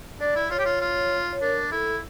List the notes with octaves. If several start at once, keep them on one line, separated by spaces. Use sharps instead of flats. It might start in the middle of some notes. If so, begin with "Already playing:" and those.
D4 D5
E4
F4 C#5
G4
F4
F4
C#5
D4 A#4
E4 A4